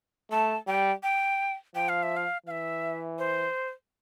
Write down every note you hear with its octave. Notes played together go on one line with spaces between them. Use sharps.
A3 A5
G3 G5
G5
F3 G5
F5
E5
F5
E3 E5 F5
C5